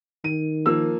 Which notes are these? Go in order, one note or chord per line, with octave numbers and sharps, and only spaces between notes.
D#3 D#7
F3 A#3 E6